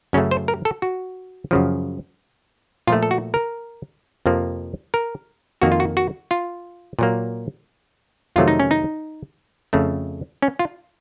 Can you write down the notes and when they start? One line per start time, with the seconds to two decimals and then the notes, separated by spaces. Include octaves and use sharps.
0.13 F#2 C#3 A3 C#4
0.31 C5
0.48 A#4
0.65 A4
0.82 F#4
1.51 F#2 C#3 F3
2.87 A#2 F3 A3 F4
3.03 A4
3.11 F#4
3.34 A#4
4.26 F2 C3 F3 A#3
4.94 A#4
5.62 F2 D#3 A#3 F#4
5.72 F4
5.80 F#4
5.97 F#4
6.31 F4
6.99 A#2 F#3 A#3
8.36 F2 C3 D#3 F#3 A3 F4
8.48 D#4
8.60 C#4
8.71 D#4
9.73 F2 C#3 A3
10.42 C#4
10.59 F4